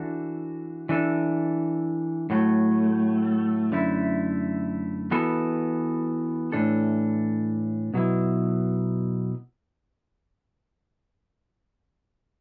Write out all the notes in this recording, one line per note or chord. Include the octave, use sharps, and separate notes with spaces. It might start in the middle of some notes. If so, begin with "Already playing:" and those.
Already playing: E3 D4 F#4 A4
E3 D4 A4
A2 F#3 A3
F#2 D3 A3 E4
E3 B3 F#4 A4
A2 E3 D4 A4
B2 F#3 B3 E4